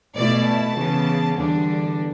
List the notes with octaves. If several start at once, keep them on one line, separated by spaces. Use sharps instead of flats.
B2 A3 E4 D5
A5
C#3 E3 B3
E2 D3 G3 D4